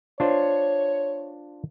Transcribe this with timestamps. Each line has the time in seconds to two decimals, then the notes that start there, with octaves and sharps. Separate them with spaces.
0.20 D4 F4 C5 C#5